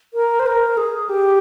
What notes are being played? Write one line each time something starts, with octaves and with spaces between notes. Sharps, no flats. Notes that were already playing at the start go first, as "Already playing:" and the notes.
A#4
C5
A#4
G#4
G4